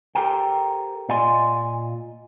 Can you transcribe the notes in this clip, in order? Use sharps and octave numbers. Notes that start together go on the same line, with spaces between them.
G4 A4 A#4 C5 G5
A#2 F4 D5 D#5 G#5 C6